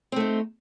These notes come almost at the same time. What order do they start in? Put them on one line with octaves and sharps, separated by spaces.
C4 A3 D#4